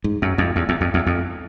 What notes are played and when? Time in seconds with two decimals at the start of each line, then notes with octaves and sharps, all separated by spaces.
0.04 G#2
0.22 F#2
0.38 F2
0.56 E2
0.69 E2
0.81 F2
0.94 E2
1.06 F2